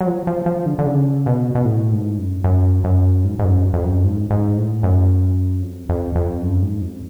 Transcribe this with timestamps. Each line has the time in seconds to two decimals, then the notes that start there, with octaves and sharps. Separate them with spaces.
0.01 F#3
0.07 F3
0.27 F3
0.46 F3
0.66 D3
0.79 D3
0.86 C#3
1.26 B2
1.55 B2
1.65 A2
1.92 G#2
2.18 F#2
2.44 F#2
2.84 F#2
3.24 G#2
3.39 G#2
3.44 F#2
3.73 F2
3.84 F#2
4.04 G#2
4.30 G#2
4.57 A2
4.83 F#2
5.62 F2
5.89 F2
6.16 F2
6.42 F#2
6.62 G#2
6.81 F2